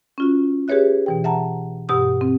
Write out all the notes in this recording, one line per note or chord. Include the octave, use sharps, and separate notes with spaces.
C#4 F4 F#4
G4 G#4 B4 C#5 E5 F#6
B2 E3 G5
E5 F#5 A5 A#5
G2 B2 G4 F#5 D#6 E6
C4